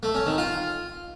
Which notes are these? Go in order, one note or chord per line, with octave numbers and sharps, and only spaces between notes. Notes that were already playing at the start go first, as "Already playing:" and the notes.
A3
C#4
D#3
F4